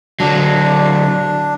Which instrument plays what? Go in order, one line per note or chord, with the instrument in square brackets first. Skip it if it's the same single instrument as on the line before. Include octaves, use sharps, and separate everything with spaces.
[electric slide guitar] D3 F#3 [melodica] D4